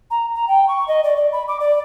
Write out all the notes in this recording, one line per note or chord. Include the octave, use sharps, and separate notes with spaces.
A#5
A#5
G5
C#6
D#5
D5
D5
B5
D6
D5